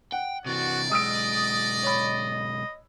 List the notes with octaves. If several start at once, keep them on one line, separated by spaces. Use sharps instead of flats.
F#5 G5
C3 E3 F#4 D5
B1 G#3 D#5 D#6 E6 D7
C#5 B5